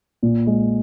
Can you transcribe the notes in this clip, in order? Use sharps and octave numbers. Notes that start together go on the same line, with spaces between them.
A#2
G#3